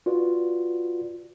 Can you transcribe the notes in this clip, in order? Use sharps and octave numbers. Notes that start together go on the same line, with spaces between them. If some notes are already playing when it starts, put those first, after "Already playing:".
F4 F#4 B4 D5